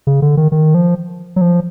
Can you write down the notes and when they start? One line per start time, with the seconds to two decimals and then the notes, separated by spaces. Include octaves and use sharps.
0.07 C#3
0.22 D3
0.37 D#3
0.52 D#3
0.74 F3
1.36 F#3
1.41 F3